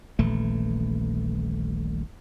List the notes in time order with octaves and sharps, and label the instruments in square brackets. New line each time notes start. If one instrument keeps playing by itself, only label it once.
[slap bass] D#1 A#1 E3 A3